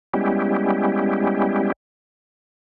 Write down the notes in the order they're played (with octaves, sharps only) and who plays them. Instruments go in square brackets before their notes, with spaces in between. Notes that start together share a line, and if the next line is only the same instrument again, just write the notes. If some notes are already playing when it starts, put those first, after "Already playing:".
[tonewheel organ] G3 G#3 B3 C#4 E4 G4